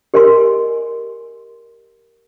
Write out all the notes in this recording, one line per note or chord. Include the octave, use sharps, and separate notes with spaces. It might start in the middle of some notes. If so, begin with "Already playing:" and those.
G4 A#4 D#5 G#5 C6